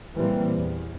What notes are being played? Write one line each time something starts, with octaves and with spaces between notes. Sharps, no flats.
A#2 E3 G3 A#3 C4
E2